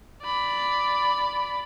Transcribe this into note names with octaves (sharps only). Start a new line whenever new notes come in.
D5 B5